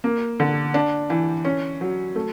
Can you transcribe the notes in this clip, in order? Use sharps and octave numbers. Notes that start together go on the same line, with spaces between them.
A#3
D3
D4
E3
C#4
F#3
A3